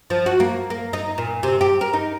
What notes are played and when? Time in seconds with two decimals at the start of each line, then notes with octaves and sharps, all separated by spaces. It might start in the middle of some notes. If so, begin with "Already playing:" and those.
0.10 F3
0.26 F#4
0.40 A#3
0.70 A#3
0.93 D#4
1.18 A#2
1.43 C3
1.61 G4
1.81 A#4
1.93 D#4